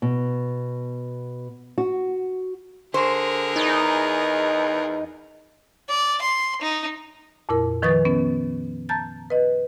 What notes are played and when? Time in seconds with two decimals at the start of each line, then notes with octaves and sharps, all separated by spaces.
0.02 B2
1.78 F#4
2.94 D3 G#4 A#4 C5
3.56 E2 D#4
5.89 D5
6.22 C6
6.62 D#4
7.49 F2 A#2 E4 A#4
7.82 D#3 F3 B4 C#6 D#6 A6
8.05 B3 C#4
8.89 A5 A#5 G6 A6
9.30 B4 D#5